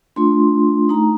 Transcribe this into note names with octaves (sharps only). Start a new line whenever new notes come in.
A3 D4 F4 C6
A3 D#4 A#5